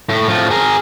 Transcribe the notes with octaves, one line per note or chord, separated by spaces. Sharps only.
A2
A2 F3
G#4 A#4